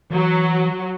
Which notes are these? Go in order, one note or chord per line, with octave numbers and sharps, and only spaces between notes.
E3 F#3